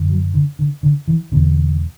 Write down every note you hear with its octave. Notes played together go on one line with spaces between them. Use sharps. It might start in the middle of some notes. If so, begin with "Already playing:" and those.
Already playing: F#2 D3
F#3
D3
D3
D3
E3
E2 B2 D3